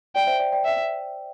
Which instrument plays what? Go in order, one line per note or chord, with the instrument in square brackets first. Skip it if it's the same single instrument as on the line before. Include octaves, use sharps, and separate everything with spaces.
[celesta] D5 [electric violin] G5
[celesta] C5 E5
D5 G5
D5 G5
[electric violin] E5